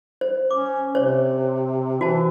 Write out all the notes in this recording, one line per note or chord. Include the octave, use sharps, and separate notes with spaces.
C5
C#4 D6
C3 C5 C#5
E3 F#4 C5 A5